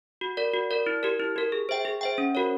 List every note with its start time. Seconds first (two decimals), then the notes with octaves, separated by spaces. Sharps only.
0.21 F#4
0.37 A#4 D5
0.54 F#4
0.71 A#4 D5
0.86 E4
1.03 G4 A#4
1.20 E4
1.36 G4 A#4
1.52 G#4
1.69 C5 E5 G5
1.85 G#4
2.01 C5 E5 G5
2.18 C#4
2.35 F#4 A#4 C#5